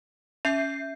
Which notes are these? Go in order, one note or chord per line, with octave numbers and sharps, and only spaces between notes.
C#4 E5 G6 C7